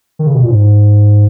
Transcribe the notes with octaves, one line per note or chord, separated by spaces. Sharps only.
D#3
C#3
B2
A#2
G#2